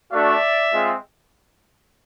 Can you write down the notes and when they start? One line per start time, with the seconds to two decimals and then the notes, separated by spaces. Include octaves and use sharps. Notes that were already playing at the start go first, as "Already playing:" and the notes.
0.12 A3 D4 F#4 D5 E5
0.72 G#3 C4 F4